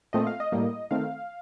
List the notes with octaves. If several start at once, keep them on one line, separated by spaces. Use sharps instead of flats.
A#2 A3 C4 D#5
F5
D#5
A2 G3 A#3
D#3 A3 C4 F5